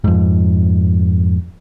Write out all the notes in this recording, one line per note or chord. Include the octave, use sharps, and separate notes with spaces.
F2 G#2